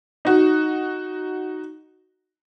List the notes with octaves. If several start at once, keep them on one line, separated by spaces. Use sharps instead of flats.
D#4 F#4